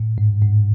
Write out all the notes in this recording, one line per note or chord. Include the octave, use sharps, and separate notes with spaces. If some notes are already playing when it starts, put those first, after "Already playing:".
Already playing: A2
G#2
G#2